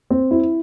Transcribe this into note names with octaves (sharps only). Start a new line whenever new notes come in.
C4
E4